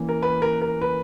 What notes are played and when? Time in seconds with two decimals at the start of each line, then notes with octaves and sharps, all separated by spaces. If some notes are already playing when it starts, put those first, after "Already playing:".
Already playing: E3 A#3 C#4
0.09 A#4
0.23 B4
0.42 A#4
0.62 A#4
0.82 B4